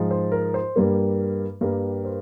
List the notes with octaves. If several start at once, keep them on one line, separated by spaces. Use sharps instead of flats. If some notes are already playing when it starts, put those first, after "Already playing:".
Already playing: G#2 F3 G#3
C5
A#4
C5
G2 G3 A#3
G2 G3 A#3 A#4
C5